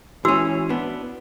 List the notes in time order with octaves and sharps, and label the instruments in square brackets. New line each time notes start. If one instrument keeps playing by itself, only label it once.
[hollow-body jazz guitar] E3 C#4 [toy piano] F#4 E6
[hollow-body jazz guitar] B3 D4